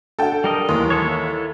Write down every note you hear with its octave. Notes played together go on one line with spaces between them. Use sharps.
D4 F#4 A4 F#5 G5
G3 A#4 D#5
D#2 E3 C6 D#6
E4 A4 C#5